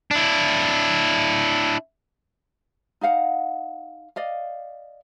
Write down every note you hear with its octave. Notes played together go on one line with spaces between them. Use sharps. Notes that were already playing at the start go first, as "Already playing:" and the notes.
D4 E4
D#4 D#5 F5 F#5
D5 D#5 F5